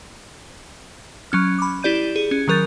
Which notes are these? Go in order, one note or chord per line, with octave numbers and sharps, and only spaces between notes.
F#3 C#4 F6
B5 D6
E4 G4 D5 G6 D#7
G#4
C#4
D#3 F#3 A#4 G6 A6